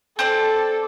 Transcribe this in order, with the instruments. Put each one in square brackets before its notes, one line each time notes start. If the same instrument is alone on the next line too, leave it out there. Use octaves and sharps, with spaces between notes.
[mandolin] C4 C5 D5 [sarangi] A4